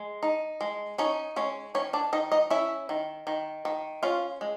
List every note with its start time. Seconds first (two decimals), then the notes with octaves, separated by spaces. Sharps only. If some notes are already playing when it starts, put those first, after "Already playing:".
Already playing: G#3
0.23 D#4
0.61 G#3
0.98 C#4 D#4 C#5
1.36 G#3 C#4 C#5
1.75 D#3 C#4 C#5
1.93 D4 D5
2.13 D#3 D#4 D#5
2.32 D#4 D#5
2.50 C#4 E4 E5
2.89 D#3
3.27 D#3
3.65 D#3
4.03 C#4 F4 F5
4.41 G#3